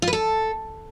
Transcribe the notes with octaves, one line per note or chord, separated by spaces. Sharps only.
F4
B4
A4